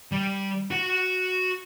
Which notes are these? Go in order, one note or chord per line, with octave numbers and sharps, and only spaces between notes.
G3
F#4 F#5